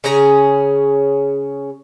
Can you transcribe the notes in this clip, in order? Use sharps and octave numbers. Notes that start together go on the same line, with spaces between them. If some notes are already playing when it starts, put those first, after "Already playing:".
C#3 C#4 G#4 A#5